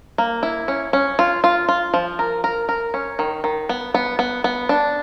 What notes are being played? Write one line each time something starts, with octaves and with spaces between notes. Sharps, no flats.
A#3
E4
C#4
C#4
F4
F4
F4
F3
A#4
A#4
A#4
C#4
D#3
D#3
B3
B3
B3
B3
D4